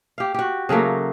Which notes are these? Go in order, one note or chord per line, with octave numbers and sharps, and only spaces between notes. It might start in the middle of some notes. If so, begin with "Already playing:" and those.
G4 F5
F#4 G4
C#3 F#3 A3 A#3